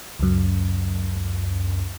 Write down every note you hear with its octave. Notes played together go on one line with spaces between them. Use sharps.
C#2 F#2